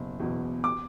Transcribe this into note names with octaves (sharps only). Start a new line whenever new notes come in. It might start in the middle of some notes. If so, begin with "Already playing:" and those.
Already playing: F#1 B2
E2 B2
D6